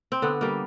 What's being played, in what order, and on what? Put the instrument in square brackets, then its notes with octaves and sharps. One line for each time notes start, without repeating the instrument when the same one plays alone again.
[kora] C4
D3 B3
G3 A#3